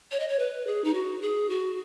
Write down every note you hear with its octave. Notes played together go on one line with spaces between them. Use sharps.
C#5
D#5
C#5
B4
G#4
D#4
F#4
G#4
F#4